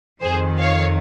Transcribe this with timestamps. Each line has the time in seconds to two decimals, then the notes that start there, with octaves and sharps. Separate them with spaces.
0.22 F2 D#3 G#4 C5
0.59 C#5 F5